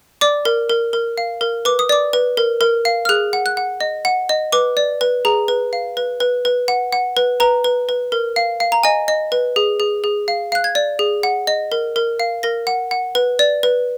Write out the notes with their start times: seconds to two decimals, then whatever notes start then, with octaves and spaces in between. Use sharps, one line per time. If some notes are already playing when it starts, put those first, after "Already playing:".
0.21 D5 D6
0.45 A#4
0.69 A#4
0.93 A#4
1.18 F5
1.41 A#4
1.65 B4 D6
1.79 D#6
1.89 D5 D6
2.13 B4
2.37 A#4
2.61 A#4
2.85 F5
3.05 F6
3.09 G#4 F#6
3.33 F#5
3.46 F#6
3.57 F#5
3.81 D#5
4.05 F#5
4.29 D#5
4.52 B4 D6
4.77 D5
5.01 B4
5.25 G#4 A#5
5.48 B4
5.73 F5
5.97 B4
6.20 B4
6.45 B4
6.68 F#5
6.92 F#5
7.17 B4
7.40 B4 A#5
7.64 B4
7.89 B4
8.12 A#4
8.36 F5
8.60 F5
8.72 A#5
8.83 D#5 G#5
9.08 D#5
9.32 B4
9.56 G#4
9.80 G#4
10.04 G#4
10.28 F5
10.52 F5 F#6
10.64 G#6
10.75 D5
10.99 G#4
11.23 F#5
11.47 D#5
11.72 A#4
11.96 A#4
12.20 F5
12.43 A#4 A#6
12.67 F#5
12.91 F#5
13.15 B4
13.39 D5
13.63 B4